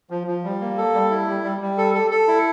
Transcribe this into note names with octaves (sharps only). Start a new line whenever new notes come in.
F3
F3
G3
A#3
A4
G3
E4
G3
G3
G3
A4
A4
A4
E4